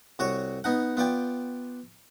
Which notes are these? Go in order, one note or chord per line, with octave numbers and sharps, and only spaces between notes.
C2 F#4 C#5 C#6
B3 D#4 F#5
B3 F4 D5 G5